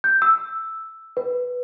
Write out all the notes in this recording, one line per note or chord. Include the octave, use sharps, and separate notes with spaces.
G6
E6
B4